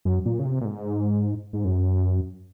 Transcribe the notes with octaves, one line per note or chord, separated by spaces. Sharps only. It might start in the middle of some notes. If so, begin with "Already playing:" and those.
F#2
A#2
C#3
C3
A#2
G#2
G#2
F#2